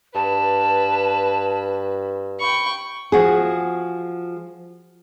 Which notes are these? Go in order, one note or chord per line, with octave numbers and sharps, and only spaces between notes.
G2 B4 A5
G5 B5 C#6
F3 F#4 G#4